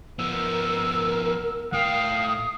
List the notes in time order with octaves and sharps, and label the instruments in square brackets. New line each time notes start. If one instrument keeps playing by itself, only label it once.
[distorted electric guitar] F3 B3 [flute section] A#4 [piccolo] E6
[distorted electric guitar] A2 G5 [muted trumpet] F5 [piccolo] D#6